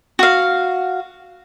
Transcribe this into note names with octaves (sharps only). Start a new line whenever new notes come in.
F#4 F5